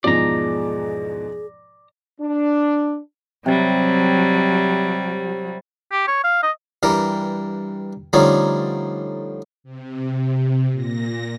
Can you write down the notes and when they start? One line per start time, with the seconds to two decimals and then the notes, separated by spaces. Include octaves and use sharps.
0.04 E2 G#2 B2 F3 D#4 G#4 D5 A#5
2.21 D4
3.46 C3 F#3 G3
5.92 G4
6.08 C#5
6.24 F5
6.43 D#5
6.83 G2 E3 G3 A#4
8.13 D3 F3 G3 A3 C#4 D#4
9.64 C3
10.72 A#2 A#6